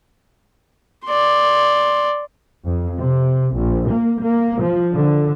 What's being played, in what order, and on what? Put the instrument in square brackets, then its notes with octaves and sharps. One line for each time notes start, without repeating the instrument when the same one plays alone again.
[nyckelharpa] D5 C6
[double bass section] F2
C3
A#1
A#3
A#3
F3
D3